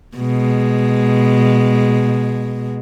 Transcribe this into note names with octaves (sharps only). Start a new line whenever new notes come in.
B2 G#3